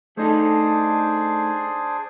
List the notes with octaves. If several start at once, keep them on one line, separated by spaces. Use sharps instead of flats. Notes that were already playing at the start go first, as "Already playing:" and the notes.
A3 D4 D#4 G#4 A4 C5